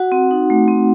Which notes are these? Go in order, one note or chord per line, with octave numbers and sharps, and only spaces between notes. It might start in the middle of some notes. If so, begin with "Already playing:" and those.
Already playing: F#4 F#5
C4
D#4
A3
C4